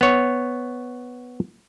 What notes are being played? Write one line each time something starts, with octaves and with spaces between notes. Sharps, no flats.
B3 C#5